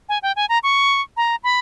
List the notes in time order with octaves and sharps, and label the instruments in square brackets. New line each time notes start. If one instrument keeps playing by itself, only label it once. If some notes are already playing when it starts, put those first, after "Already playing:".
[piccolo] G#5
G5
G#5
A#5
C#6
A#5
B5